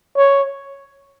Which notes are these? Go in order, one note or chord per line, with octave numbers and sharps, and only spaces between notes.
C#5